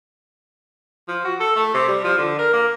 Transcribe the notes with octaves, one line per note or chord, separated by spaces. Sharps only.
F3
F#4
A4
A3
C3
G3
F3
D3
A#4
A#3